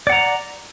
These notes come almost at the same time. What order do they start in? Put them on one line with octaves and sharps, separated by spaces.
D5 F#5 A#5